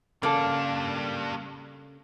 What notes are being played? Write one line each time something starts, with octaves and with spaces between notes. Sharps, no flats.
C#3 G3 A#3 D4 A4